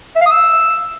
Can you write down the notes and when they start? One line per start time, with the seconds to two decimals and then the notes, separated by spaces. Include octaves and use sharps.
0.16 E5
0.21 F5
0.26 D#6
0.31 E6